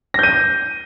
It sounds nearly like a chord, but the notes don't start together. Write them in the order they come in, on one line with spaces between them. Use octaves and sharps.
A#6 G6 D#7